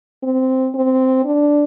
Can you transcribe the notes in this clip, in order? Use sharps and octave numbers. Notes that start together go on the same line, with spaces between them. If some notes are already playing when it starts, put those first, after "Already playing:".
C4
C4
D4